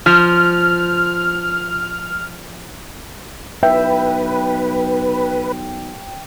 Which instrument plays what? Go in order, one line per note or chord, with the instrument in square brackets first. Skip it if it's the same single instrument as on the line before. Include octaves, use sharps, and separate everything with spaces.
[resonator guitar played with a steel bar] F3 [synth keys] F6
[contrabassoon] B1 [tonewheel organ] B4 [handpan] E5 [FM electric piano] G5